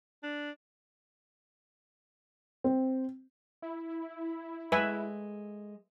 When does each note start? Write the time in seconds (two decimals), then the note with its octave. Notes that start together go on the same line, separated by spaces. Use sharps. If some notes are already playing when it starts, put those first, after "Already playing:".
0.23 D4
2.64 C4
3.62 E4
4.72 G#3 A3 B4 E5 G#5